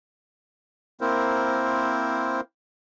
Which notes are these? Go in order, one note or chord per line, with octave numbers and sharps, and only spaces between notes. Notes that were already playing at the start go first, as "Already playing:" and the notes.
A#3 C4 E4 A#4 C5